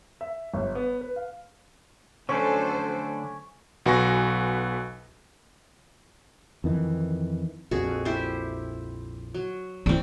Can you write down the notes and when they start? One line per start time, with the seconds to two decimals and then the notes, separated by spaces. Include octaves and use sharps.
0.21 E5
0.54 G1
0.75 B3
1.01 B4
1.16 F5
2.29 D3 F#3 A3 C#4 D4 A4 C5
3.86 B1 F#4 B4 G#5 C#6 A#6
6.64 F2 D#3 E3
7.71 A#1 F2 F#4 G#4
8.05 E4 G4 C5
9.34 F#3
9.86 C4 C#4 E4 D5